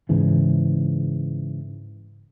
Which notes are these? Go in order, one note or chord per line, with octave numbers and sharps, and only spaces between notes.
G#2 C#3 E3